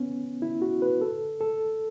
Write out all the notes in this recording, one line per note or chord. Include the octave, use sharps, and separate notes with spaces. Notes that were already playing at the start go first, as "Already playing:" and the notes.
Already playing: B3 C#4
E4
F#4
B4
A4
A4